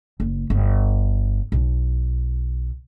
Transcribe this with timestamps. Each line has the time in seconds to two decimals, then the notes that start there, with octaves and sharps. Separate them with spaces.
0.20 F#1
0.50 G1
1.52 B1